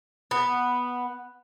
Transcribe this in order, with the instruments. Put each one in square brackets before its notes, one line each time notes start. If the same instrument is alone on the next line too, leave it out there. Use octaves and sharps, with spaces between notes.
[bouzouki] B3